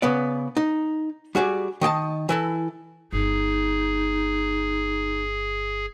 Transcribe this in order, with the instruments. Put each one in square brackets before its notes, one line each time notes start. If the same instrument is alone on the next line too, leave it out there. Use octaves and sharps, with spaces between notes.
[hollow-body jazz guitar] C#3 B3 D5
D#4
G3 F#4 G#4 D5
D#3 D#5 G5 A5
E3 E4 A4
[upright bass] G1 [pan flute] D#4 [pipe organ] G#4